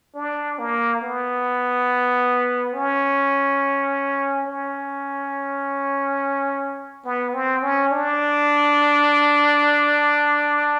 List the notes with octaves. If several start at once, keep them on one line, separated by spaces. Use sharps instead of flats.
D4
A#3
B3
C#4
C#4
B3
C4
C#4
D4